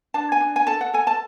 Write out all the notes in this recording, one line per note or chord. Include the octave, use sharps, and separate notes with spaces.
D4 A5
G#5
D4
G#5
A4 A5
F#5
A4 G#5
A5